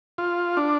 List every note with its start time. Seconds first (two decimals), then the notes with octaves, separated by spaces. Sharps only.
0.18 F4
0.57 D4